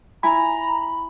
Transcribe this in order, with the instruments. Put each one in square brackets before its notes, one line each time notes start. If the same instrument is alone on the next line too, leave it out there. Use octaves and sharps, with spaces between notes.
[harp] E4 G#5 [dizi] A#5 [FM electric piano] B5